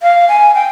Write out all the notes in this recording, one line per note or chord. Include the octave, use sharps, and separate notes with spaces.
F5
G#5
G5